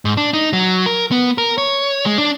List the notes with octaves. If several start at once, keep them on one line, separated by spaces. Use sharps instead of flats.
G#2
D4
D#4
F#3
A#4
B3
A#4
C#5
G#3
D4